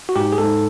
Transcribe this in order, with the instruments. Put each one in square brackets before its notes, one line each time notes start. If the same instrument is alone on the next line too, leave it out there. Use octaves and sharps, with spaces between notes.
[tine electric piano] F#4
G#2 G4
G#4
G#2 A4